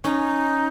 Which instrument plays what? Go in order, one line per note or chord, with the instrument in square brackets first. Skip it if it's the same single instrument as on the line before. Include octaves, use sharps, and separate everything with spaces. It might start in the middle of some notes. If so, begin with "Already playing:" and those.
[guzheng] C#4 [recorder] D#4